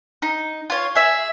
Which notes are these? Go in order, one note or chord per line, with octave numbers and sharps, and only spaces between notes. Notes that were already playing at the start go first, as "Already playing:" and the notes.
D#4
F4 C#5
G#4 E5